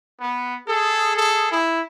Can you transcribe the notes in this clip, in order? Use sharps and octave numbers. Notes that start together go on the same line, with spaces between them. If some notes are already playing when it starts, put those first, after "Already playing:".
B3
G#4 A4
A4
E4